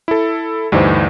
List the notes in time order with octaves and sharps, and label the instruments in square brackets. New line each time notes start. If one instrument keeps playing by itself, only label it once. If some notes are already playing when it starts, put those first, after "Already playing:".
[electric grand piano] E4 A4
D2 G2 E3 D#4 C5